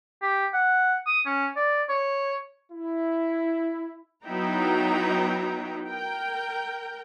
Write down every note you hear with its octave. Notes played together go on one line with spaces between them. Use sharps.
G4
F#5
D#6
C#4
D5
C#5
E4
F#3 B3 D#4 E4 G5 A#5
A#4 G5